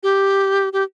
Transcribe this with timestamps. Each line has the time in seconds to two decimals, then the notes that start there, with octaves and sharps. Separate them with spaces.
0.03 G4
0.73 G4